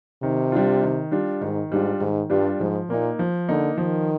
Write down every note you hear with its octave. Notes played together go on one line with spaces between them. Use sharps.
C3 D#3
G3 D4 F4
D#3
G3 D4 F4
G#2 D#3
G#2 G3 D4 F4
G#2 D#3
G2 G3 D4 F4
G#2 F3
A#2 A#3 D#4
F3
D3 A#3 D#4
D#3 F3